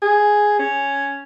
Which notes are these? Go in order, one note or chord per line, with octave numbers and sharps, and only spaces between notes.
G#4
C#4